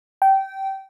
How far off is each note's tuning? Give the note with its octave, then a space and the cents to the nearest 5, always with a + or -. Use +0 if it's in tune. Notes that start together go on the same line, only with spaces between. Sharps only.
G5 -20